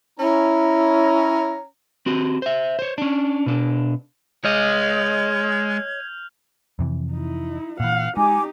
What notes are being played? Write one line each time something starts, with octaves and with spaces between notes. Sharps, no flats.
C#4 E4 A#5
C4 F#4 G4
C5 E5
C5 C#5
C#4 D4
B2 D4
G#3 C#5 D#5 F6 G6 G#6 F7
F2 C3 E3
D#4 E4
A#2 E3 F5 F#5
G#3 D#4 G4 G#5 D6